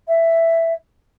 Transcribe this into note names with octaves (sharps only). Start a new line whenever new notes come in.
E5